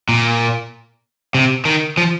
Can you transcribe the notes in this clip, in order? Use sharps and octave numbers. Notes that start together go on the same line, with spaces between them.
A#2
C3
D#3
F3